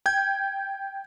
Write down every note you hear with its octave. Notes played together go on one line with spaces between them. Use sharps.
G5 G6 G#6